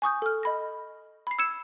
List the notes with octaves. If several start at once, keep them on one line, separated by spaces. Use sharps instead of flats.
G#5 C#6 D#6 G6
A4 F6
D#5 B5 A#6
B5 C7
E6 G#6 C#7 E7